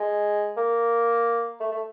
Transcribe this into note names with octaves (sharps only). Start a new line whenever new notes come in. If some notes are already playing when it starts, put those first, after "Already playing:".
Already playing: G#3
A#3
A3
A3